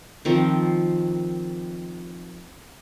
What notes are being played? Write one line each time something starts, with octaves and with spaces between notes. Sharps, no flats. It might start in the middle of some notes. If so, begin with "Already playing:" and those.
D#3 F3 C4